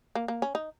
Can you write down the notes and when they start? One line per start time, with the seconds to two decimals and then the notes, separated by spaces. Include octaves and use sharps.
0.15 A#3
0.28 A#3
0.42 C#4
0.55 D#4